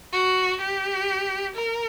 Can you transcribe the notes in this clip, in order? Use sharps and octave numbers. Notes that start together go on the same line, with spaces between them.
F#4
G4
A#4